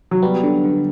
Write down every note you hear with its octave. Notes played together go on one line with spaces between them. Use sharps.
F#3
G3 B3
D3
D3